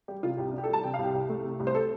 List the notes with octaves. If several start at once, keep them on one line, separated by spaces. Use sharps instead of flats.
G3 G4
C3 F4
C2 G4
D4 G4
A4
G3 A5
C3 G5
F5
C2
G4
C2
A3
C3
C2
C5
A4